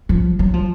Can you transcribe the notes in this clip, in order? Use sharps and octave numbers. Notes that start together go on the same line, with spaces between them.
F3
F#3
F3